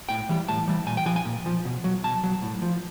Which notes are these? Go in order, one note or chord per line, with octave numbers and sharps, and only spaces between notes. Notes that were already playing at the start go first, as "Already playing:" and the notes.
A2 G5
E3 G3
A2 A5
E3 G3
A#2 G#5
G5
F3 G#5
G#5
A#2
F3
B2
F#3
B2 A5
F#3
A2
F3